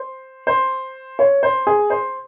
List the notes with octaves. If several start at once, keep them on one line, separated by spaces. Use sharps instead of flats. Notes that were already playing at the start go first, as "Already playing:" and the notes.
Already playing: C5
C5
C#5
C5
G#4
C5